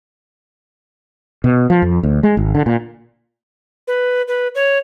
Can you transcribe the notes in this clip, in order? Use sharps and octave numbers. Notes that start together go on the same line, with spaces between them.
B2
F3
F2
D2
G#3
G#1
D3
A#2
B4
B4
C#5